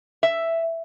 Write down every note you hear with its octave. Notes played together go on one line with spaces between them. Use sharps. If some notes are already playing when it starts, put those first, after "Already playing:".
E5